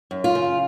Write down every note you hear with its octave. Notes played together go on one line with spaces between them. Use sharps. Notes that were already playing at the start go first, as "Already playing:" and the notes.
F#2
F4
C#3